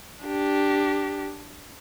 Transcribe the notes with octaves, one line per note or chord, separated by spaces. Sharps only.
D4 G4